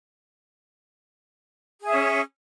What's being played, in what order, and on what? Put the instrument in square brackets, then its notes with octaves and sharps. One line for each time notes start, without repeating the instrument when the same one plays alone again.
[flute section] G#4
E5
C#4